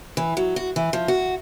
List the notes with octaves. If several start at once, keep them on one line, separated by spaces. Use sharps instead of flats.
E3
F#3
F#4
E3
F3
F#4